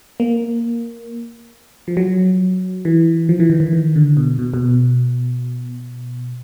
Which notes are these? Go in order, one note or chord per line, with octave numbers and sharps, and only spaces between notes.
A#3
F3
F#3
E3
F3
E3
D#3
E3
D#3
D3
B2
B2
B2